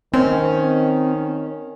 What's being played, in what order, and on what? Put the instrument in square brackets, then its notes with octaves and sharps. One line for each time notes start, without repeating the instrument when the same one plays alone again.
[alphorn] D#3 [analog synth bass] C4 [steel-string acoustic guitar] C#4